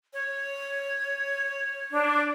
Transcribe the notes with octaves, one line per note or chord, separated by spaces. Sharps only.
C#5
D4